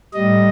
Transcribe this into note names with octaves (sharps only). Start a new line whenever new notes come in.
A2 G3 D#5